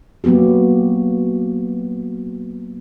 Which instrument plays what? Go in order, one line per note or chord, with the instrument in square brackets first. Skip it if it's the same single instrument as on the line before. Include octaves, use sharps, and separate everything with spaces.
[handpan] F#3 A#3 B3 F#4 G4